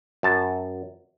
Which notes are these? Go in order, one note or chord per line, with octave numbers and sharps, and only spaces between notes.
F#2 A5